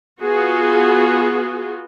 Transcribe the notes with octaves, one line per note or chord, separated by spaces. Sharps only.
B3 F4 F#4 G#4